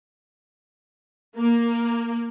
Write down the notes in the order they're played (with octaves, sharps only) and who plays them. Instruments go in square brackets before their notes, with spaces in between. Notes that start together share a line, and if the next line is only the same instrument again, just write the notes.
[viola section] A#3